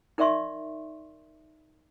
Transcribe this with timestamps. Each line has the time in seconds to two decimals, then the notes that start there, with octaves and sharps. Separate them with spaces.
0.18 D#4 A#4 D5 E5 C6 C#6